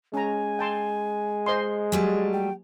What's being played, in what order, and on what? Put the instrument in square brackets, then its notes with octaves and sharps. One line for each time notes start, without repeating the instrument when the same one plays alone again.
[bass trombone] G#3 [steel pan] C#4 A#5 [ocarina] G#5
[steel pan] G5 A5 C6
C5 D#5 C6
[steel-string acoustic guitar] F#3 G3 A3 [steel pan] G#5
[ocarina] G5